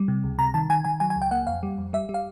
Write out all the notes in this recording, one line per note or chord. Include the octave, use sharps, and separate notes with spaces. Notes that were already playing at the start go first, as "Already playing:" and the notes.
Already playing: G3
C3
C#2
C3 A#5
D#3 A5
D#3 G#5
D#3 G#5
F#3 G#5
G#5
C#2
G5
A#3 F#5
F2 F5
G3
F2
G3 E5
G3
F5